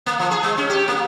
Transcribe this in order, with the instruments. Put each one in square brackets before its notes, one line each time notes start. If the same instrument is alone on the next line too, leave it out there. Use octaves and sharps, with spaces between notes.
[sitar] A#3
F3
G#4
G#3
C#4
G4
A#3